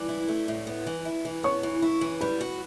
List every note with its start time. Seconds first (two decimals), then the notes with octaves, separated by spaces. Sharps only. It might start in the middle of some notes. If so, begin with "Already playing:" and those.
Already playing: E3 D5 D6
0.09 E4
0.28 A3
0.48 A2
0.67 B3
0.86 E3
1.05 E4
1.25 E3
1.43 B3 C#5 C#6
1.63 E3
1.82 E4
2.01 E3
2.21 G3 B4 B5
2.41 F#4